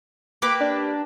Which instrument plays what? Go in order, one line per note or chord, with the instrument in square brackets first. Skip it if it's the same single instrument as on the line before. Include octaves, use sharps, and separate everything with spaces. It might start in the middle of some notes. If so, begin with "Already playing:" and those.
[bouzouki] A#3 G4 B4 [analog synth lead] D6
[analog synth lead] D4